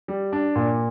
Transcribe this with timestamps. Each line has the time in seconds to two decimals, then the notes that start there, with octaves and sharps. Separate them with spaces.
0.08 G3
0.33 D4
0.56 A#2